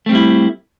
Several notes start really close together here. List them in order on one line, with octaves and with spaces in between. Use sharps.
A3 C4 G3 E4